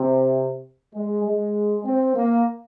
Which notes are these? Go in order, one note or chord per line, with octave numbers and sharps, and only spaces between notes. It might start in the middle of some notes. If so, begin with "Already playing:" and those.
Already playing: C3
G#3
G#3
C4
A#3